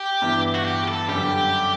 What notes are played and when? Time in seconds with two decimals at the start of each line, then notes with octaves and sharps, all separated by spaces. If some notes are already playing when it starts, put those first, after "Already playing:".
Already playing: G4
0.22 G2 E3 B3
0.55 F#4
0.65 G4
0.88 A4
1.09 F#2 D3 G3 G4